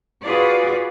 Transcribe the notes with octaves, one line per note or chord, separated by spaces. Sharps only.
F4 F#4 G#4 B4 D5